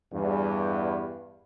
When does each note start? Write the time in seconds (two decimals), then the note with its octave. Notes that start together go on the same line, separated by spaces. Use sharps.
0.13 E2 G2